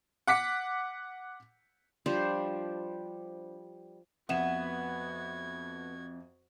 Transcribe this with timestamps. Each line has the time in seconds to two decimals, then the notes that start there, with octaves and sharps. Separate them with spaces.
0.27 F#5 D6 B6 C#7
2.06 F3 G3 D4 C5
4.29 F2 B3 F#4 E5 G#6 E7